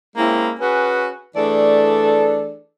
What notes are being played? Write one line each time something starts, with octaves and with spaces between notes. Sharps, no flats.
G#3 A#3 C4 C#4 E4
C#4 F#4 G#4 B4
E3 A3 D4 G#4 A4 D5